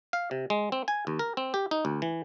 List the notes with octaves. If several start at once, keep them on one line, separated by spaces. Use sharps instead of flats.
F5
C3
G#3
C4
G#5
D#2
A#4
C4
G4
D#4
D2
E3